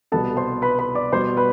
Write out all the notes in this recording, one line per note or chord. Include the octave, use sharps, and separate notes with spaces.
C2 B2 G3 B3 A4 A5
C5 C6
B4 B5
B4 B5
D5 D6
B2 G3 B3 C5 C6
B4 B5